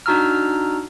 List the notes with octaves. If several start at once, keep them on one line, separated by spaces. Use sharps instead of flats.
D4 D#4 F#4 A#5 E6 F6